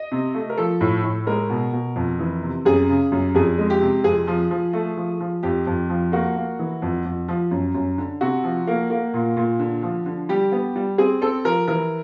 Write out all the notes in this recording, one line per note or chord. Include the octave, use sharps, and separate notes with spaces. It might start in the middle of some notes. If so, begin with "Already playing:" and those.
Already playing: D#5
C3
A3
A#4
F3 A4
A2
A2
G#3 A#4
B2
B2
F2
E3
C3
F#2 G#4
C#3
F#2
F2 G#4
G#3
G4
C3
F2 G#4
F3
F3
A3
F3
F3
F2 G4
F2
F3
A#3 F#4
A#3
E3
F2
F2
F3
F#2
F#2
D3
C3 F#4
F3
A#3
A#3
A#2
A#2
D3
F3
D3
G3 G4
B3
G3
C4 G#4
C4 A4
F3 A#4
E3 A#4